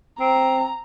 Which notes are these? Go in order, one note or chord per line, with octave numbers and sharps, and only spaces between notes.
C4 A#5